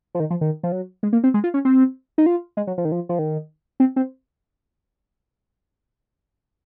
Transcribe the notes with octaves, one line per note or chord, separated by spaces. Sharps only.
F3
D#3
F3
D#3
F3
F#3
G#3
A#3
C4
G#3
F4
C#4
C4
D#4
F4
G#3
F#3
F3
D#3
F3
F3
D#3
C4
C4